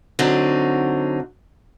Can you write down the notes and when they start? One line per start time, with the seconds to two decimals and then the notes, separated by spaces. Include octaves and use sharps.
0.19 D3 F#3 C4 D#4